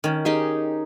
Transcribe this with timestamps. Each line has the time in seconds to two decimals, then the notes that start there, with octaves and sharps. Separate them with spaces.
0.04 D#3 C#4
0.25 D#4 G4 G#4